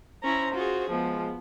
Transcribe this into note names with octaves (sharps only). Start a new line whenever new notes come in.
C#4 E4 C5 A#5
F4 F#4 G#4
F3 G#3 B3